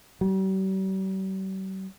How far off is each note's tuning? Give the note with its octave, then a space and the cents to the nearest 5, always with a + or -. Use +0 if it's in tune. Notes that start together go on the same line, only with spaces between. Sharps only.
G3 -45